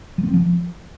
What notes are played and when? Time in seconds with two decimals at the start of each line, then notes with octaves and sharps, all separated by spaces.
0.18 F#3
0.23 B3
0.28 C4
0.33 F3